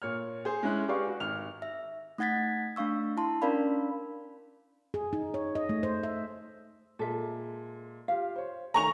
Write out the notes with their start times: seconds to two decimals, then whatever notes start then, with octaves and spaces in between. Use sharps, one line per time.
0.02 A#2 C#5 F6
0.45 G#4 C5
0.63 G#3 C#4 E4 F#6
0.88 G4 G#4 B4 D5 F5 C#6
1.07 F#4
1.20 G#1 F6 F7
1.62 E5
2.18 A3 D#4 F#5 G#6 A6 B6
2.76 A3 D4 F5 C#6 E6
3.17 E4 A5 C6
3.42 C#4 D4 A#4 D5 F5 B5
4.94 G#4
5.13 D#4
5.34 C#5
5.55 D#5
5.69 A3
5.83 C5
6.03 E5
6.99 A#2 G#3 A4 E5
8.08 F4 G4 F5
8.36 C5 C#5
8.74 D#3 A3 G#5 A#5 C#6 F7